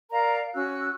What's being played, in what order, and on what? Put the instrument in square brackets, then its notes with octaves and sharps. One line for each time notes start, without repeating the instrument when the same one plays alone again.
[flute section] A#4 D5 F5 A#5
C#4 F#4 E6 F#6